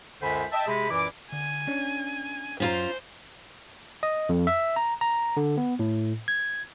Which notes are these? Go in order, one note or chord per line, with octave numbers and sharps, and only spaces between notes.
C#2 F#2 D3 C5 G#5 B5
D#5 E5 G5 A5
C3 G#3 G#4 B5
F#2 A#2 E3 E4 D6
D3 G#5
C#4 D4 C#5
F#2 C#4 F4 C5 A#5
D#5
F2
E5
A#5
A#5
D3
B3
A2
G#6